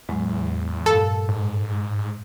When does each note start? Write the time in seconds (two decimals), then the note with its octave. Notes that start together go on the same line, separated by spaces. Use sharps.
0.09 E2 A2 F#3 G#3
0.86 G2 A#2 A4 F5
1.28 G#2